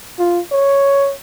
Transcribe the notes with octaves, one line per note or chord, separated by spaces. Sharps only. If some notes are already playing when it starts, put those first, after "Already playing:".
F4
C#5